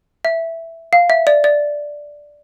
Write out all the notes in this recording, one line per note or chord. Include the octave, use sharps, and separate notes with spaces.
E5
F5
E5
D5
D5